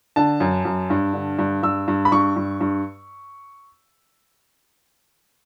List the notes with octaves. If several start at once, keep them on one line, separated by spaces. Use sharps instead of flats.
D3 A5
F#2
F#2
G2
D3
G2
G2 E6
G2
B5
G2 C#6
G2
G2